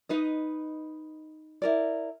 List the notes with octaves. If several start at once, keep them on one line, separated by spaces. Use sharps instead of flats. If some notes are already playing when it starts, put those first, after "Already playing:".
D#4 B4 D#5
E4 A#4 D5